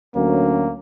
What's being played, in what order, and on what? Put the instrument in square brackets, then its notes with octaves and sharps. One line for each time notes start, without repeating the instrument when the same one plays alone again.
[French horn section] D2 F#3 C#4 [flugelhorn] A#3